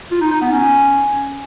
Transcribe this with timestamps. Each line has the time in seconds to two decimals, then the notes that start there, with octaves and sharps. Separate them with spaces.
0.11 F4
0.21 D#4
0.31 D#4
0.41 B3
0.51 C#4